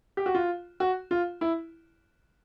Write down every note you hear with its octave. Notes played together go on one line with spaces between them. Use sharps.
G4
F#4
F4
F#4
F4
E4